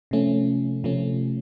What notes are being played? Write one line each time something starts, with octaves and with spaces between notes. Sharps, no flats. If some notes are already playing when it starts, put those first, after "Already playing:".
C3 F3 A3 C#4
C3 F3 A3 C#4